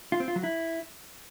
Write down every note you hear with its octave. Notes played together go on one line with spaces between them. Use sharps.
F4
C4
F4
F#3
E4